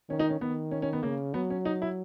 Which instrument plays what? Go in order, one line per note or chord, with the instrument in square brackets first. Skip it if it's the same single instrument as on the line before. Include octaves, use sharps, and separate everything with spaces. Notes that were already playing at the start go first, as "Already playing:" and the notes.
[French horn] D#3 [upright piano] C#4
[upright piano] D#4
C#4
[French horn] D#3 [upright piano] B3
[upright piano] C#4
C#4
B3
[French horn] C#3 [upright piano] A#3
[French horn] F#3 [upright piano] B3
[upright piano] C#4
D#4
E4